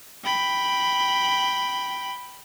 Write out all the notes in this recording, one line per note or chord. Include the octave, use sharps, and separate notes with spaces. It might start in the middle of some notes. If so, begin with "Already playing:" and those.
G5 B5